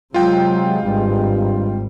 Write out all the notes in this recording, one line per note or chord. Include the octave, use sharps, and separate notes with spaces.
C3 F#3 G#3 F4 G5
G#1 G2 G3